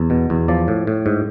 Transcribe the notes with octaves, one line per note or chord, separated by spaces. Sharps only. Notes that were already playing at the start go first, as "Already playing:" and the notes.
Already playing: E2
B2
E2
F3 D5
A2
A2
G#2